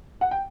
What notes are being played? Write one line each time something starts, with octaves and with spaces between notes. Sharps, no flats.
F#5
G5